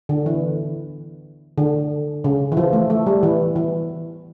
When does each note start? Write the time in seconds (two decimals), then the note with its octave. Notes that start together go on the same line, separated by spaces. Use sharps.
0.09 D3
0.26 E3
1.58 D3
2.24 C#3
2.52 E3
2.57 F3
2.73 A3
2.90 A3
3.07 G3
3.23 E3
3.56 E3